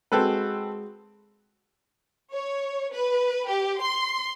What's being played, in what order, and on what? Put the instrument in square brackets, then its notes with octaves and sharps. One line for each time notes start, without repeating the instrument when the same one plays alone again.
[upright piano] G#3 F#4 [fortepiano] C4 A4 B4
[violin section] C#5
B4
G4
C6